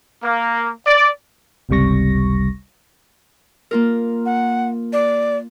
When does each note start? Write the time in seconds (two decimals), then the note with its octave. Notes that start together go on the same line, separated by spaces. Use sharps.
0.23 A#3
0.86 D5
1.69 G1 C#2 C3 G3 C#6 A#6
3.71 A#3 F4 A#4
4.26 F#5
4.93 D5